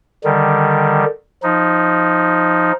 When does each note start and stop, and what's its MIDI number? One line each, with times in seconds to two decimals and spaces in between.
0.24 1.04 50
0.24 1.04 51
0.24 1.04 55
1.43 2.72 53
1.43 2.72 63